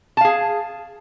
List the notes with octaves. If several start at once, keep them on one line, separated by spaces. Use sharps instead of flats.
G#4 F5 A5